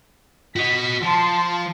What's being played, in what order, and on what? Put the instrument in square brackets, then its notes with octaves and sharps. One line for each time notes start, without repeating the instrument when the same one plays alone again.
[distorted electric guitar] F#4 D#5 [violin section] B6
[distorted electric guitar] F3 [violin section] A5 C6